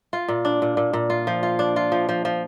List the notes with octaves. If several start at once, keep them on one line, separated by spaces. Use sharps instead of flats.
F4
A#2
D4
A#2
A#2
A#2
F4
F3
F4
D4
F4
F3
F3
F3